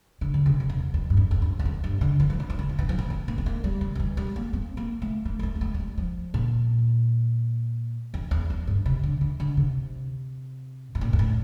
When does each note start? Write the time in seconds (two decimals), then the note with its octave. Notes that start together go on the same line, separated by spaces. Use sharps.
0.21 D3
0.34 D3
0.46 C3
0.60 F2
0.69 E2
0.94 F2
1.10 G2
1.17 F2
1.31 F2
1.42 G2
1.59 E2
1.65 F2
1.84 G2
2.01 D3
2.20 E3
2.30 F3
2.40 E3
2.50 F3
2.59 E3
2.69 F3
2.79 E3
2.89 F3
2.99 E3
3.10 C4
3.28 A#3
3.38 C4
3.46 A#3
3.64 G3
3.81 E3
3.95 D3
4.00 E3
4.17 G3
4.36 A#3
4.53 C4
4.77 A#3
5.02 A3
5.25 A#3
5.39 G3
5.43 A3
5.55 A#3
5.61 A3
5.74 A3
5.80 G3
5.98 F3
6.34 A#2
8.14 F2
8.31 E2
8.50 F2
8.67 G2
8.86 C3
9.03 D3
9.21 E3
9.40 D3
9.57 C3
10.95 A2
11.01 A#2
11.13 G2
11.19 A2